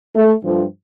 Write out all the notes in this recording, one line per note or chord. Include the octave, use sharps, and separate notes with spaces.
A3
G2 F3 A3